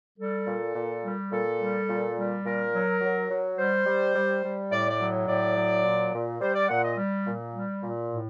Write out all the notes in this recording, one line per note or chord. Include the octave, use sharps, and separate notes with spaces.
G3 A4
A#2
A#2
G3
A#2 A4
G3
A#2
G3
A#2 A#4
F#3
F#3
F#3
G3 C5
G3
G3
G3
A2 D5
D5
F#3
A2 D5
F#3
A#2
A#2
G3 C5
D5
A#2 F#5
D#5
G3
A#2
G3
A#2
A2